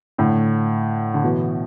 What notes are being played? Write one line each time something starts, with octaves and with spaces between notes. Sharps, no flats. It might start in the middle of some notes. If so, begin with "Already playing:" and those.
A2 D3
D3
B2 E3